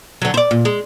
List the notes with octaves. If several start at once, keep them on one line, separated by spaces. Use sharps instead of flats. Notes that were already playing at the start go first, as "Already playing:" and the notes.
D3 F#3
C5 D5
A#2
G#3